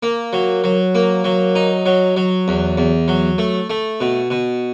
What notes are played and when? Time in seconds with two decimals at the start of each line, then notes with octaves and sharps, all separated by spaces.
0.03 A#3
0.33 F#3
0.64 F#3
0.95 A#3
1.24 F#3
1.55 D#4
1.86 F#3
2.17 F#3
2.48 E2
2.78 E2
3.08 F#3
3.38 A3
3.70 A3
4.01 B2
4.30 B2